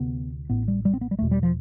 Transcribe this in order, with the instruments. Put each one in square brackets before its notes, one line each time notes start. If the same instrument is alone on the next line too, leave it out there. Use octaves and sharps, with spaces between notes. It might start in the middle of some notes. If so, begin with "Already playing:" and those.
Already playing: [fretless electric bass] D2 C3 B3
A1 A2 B3
G3
G3
C4
B3
G3
E1 E2 B2 A3
G3
F3